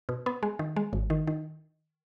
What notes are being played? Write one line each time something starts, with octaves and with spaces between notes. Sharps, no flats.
B2
B3
G#3
D#3
G#3
G#1
D#3
D#3